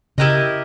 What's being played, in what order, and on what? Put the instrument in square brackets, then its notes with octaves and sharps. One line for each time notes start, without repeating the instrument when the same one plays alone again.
[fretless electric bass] C#3 [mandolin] E4 G4 A#4 D#5